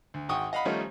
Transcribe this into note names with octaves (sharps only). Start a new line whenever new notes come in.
D2
G#1 F#4 G5 C#6 D#6
D#5 F5 F#5 B5
D#3 F3 G3 A3 C#4 D#4